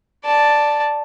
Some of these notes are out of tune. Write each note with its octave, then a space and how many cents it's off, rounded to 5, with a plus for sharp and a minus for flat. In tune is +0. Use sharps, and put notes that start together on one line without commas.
D5 +0 A5 +0